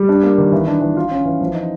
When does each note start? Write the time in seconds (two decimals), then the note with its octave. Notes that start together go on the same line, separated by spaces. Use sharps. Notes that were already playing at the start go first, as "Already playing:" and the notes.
Already playing: G3
0.09 D4
0.23 A#3
0.38 D#3
0.52 E3
0.67 D4
0.81 E3
0.97 F4
1.11 C#4
1.25 E3
1.41 F3
1.55 D#4